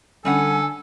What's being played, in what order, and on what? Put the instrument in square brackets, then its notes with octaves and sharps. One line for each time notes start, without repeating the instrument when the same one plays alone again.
[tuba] D3 [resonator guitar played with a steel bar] G3 C#4 F#5 [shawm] A4 [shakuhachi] G#5